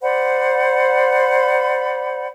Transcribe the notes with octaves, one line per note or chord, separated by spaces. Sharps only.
C5 D5 F#5 B5